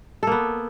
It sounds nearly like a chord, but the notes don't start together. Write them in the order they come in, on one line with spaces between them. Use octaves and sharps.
A4 A#3 B3